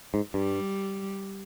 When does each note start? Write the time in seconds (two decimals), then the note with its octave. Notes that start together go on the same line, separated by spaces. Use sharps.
0.14 G#2
0.34 G2 G3